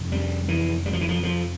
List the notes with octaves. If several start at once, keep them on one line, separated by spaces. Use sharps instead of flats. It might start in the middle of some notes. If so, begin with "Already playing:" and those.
Already playing: F2 C3
G3
E3
G3
F3
E3
F3
F3